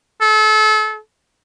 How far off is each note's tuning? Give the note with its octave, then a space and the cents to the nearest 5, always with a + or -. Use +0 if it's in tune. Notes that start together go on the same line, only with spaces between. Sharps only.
A4 -35